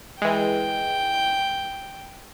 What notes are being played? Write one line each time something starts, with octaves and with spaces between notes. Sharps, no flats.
E3 G#3 G5